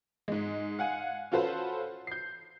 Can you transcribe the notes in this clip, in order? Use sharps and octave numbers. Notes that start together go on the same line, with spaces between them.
G#2 G#3
F5 F#5 G#5
C#4 F4 F#4 A4 B4 C5
G6 C7